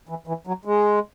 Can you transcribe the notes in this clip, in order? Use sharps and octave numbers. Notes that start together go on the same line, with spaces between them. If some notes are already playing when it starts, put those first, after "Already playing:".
E3
E3
F#3
G#3